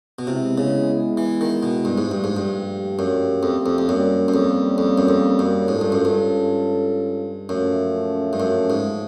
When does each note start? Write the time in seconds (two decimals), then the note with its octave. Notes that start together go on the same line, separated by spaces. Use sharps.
0.19 B2
0.27 C3 G#3 B3 E4
0.58 C#3
1.17 E3
1.41 D#3
1.63 B2
1.85 G2
1.98 G#2
2.08 G2 A#2 F3 A3 D4 G4
2.24 G#2
2.37 G2
2.99 F#2
3.43 F2
3.66 F2
3.78 F2
3.88 F#2 G3 A#3 C#4
4.28 F#2
4.34 F2
4.78 F2
4.98 F#2
5.09 F2
5.39 F#2
5.68 G#2 G#3 C#4 F4 A4
5.81 G2
5.92 F#2
6.05 G2
7.49 F#2 A#2 F3 A3 C#4
8.33 G2
8.40 F#2
8.70 G#2